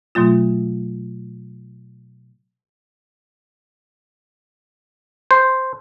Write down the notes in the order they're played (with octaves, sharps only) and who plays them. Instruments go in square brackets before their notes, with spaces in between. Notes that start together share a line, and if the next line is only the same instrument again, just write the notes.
[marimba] B2 F#3 A3 F4
[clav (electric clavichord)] C5